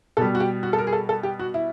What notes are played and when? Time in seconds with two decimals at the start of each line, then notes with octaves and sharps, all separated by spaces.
0.17 B2 G3 A4
0.35 F#4
0.40 G4
0.63 F#4
0.73 A4
0.78 A#4
0.87 G#4
0.93 A4
1.09 A4
1.23 G4
1.39 F#4
1.54 E4